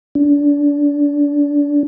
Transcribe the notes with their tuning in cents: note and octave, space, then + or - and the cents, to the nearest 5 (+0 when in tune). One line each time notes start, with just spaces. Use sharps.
D4 -25